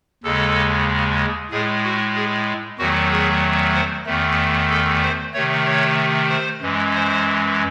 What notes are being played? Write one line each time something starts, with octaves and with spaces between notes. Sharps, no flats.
D#2 C#3 G#3 A4
A2 G#3 G#4
F#4
G#4
E2 D#3 F#3 A3 F#4
G#4
C5
E2 D#3 A3
A4
C5
C3 D#3 A3 C#5
C#5
C5
F#2 E3 G#3
C5